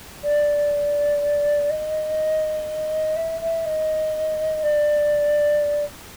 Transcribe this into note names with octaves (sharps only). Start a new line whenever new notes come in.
D5
D#5
E5
E5
D#5
D5